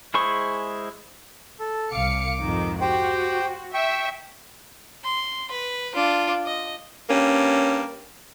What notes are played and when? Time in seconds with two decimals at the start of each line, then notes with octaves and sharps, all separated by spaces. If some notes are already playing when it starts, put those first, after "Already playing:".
0.14 G#3 E4 G#4 C5 C#6
1.60 A4
1.92 C2 F5 D6 C#7
2.40 F2 G#2 D#3
2.81 F#4 G4 C5 G5
3.74 E5 G5 C#6
5.04 C6
5.51 B4
5.94 D4 F4
6.46 D#5
7.10 G2 A#3 C#4